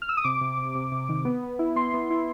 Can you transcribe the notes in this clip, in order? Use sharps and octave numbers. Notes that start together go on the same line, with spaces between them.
F6
E6
D#6
C3 D6
C3
C3
C3
C3
D#3
B3
B3
E4
B3 C6
B3
E4